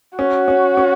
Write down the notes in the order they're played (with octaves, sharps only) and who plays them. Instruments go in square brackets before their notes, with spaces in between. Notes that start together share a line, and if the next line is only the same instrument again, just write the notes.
[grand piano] C#4 [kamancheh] F#4
[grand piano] C#4
C#4